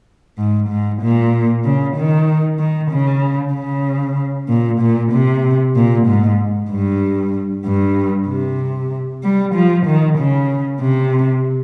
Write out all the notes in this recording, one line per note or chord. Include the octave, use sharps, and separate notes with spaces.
G#2
G#2
A#2
C#3
D#3
D#3
C#3
C#3
A#2
A#2
C3
A#2
G#2
G2
G2
C3
G3
F3
D#3
C#3
C3